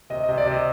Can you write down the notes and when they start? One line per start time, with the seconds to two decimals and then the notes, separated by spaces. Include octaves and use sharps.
0.10 C3 D#5
0.24 D#5
0.29 C3
0.37 D5
0.46 C3
0.51 D#5